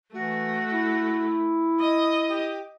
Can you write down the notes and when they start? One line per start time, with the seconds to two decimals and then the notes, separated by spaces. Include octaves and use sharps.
0.13 E3 A3 F#4
0.71 E4
1.80 D#5 D#6
2.28 G4